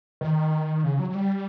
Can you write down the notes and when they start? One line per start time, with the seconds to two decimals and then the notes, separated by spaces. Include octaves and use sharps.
0.21 D#3
0.84 C#3
0.99 F#3
1.10 F#3
1.15 G3